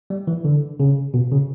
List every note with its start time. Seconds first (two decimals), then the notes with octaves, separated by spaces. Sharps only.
0.10 G3
0.27 E3
0.45 D3
0.80 C#3
1.14 B2
1.31 C#3